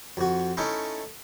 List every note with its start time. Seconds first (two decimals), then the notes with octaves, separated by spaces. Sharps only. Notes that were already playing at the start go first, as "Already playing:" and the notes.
0.17 F2 F#4
0.57 A3 C#4 D#4 E4